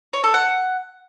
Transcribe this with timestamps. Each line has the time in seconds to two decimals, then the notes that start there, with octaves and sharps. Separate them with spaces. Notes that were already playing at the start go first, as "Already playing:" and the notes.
0.13 C#5
0.24 A4
0.34 F#5